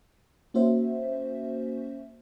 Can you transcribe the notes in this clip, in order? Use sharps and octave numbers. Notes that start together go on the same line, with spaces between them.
A#3 C#4 F#4 C5 E5